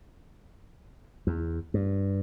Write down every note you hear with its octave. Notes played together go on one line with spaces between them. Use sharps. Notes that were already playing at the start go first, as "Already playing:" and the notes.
E2
G2